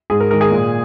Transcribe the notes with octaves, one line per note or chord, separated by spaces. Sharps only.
G#2 G#4
A#4
D#3 G#3 A#4
G#4
A#2